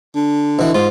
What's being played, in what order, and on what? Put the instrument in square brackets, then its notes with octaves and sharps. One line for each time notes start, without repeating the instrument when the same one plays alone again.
[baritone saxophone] D3
[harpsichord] B2 E3
[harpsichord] G#2 [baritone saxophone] F4